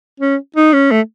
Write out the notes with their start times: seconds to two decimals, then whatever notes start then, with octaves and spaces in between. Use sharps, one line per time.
0.20 C#4
0.56 D#4
0.73 C#4
0.91 A3